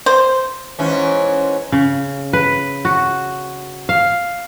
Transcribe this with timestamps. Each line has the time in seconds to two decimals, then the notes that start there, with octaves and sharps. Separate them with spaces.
0.06 C5
0.79 G#2 E3 C#4
1.72 C#3
2.33 B4
2.85 F#4
3.89 F5